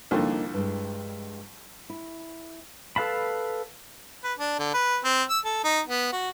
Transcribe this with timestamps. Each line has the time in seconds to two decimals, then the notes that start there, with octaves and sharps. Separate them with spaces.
0.11 C2 F2 D3 A#3 D#4
0.54 G2 G#3
1.89 E4
2.96 A4 B4 F5 A5 B5
4.24 B4
4.39 D4
4.59 D3
4.74 B4
5.04 C4
5.30 E6
5.45 A4
5.64 D#4
5.87 B3
6.13 F#4